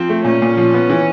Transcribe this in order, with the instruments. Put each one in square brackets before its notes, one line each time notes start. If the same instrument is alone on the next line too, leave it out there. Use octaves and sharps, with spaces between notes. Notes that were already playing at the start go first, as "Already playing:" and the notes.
Already playing: [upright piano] F3 [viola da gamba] C4
[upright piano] A3
[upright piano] A#2 [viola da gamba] C#4
[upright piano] A#2
F3
B3
E3